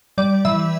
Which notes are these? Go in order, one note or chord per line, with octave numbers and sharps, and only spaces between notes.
G3 D5
E3 E5